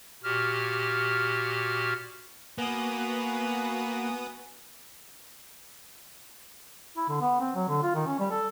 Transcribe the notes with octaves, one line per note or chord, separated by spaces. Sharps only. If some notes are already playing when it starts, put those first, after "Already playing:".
A#2 F#4 G4 F6
A#3 B3 F#4 B4 G#5 D#6
E4
D3
B3
C4
F#3
D3
F4
D#3
C#4
G3
A4